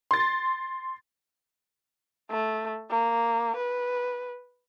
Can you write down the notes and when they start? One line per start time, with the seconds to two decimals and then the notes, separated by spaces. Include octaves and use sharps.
0.11 C6 A6
2.30 A3
2.90 A#3
3.56 B4